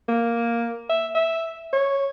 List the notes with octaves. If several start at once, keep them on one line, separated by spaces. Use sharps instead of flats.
A#3
E5
E5
C#5